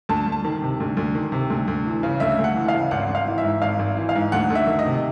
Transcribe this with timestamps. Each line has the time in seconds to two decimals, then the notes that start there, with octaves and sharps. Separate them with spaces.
0.09 D2 A5
0.27 D2
0.32 A5
0.45 D#3
0.62 C3
0.80 D2
0.97 D2
1.15 D#3
1.32 C3
1.50 D2
1.68 D2
1.86 E3
2.03 C#3
2.20 D2 E5
2.39 D2
2.44 F#5
2.56 E3
2.68 F5
2.74 C#3
2.91 G#1 F#5
3.09 G#1
3.15 F5
3.27 E3
3.38 E5
3.44 G#2
3.62 G#1 F5
3.79 G#1
3.97 E3
4.09 F5
4.15 G#2
4.32 D2 F#5
4.50 D2
4.55 E5
4.67 D#3
4.79 D#5
4.86 C3